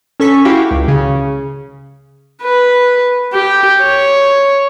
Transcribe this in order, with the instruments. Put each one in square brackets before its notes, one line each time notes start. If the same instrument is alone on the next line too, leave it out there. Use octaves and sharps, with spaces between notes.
[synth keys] C#4 A4 C#6 B6
E4 F#4 G4 F5 G5
C#2
C#3
[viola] B4
G4
C#5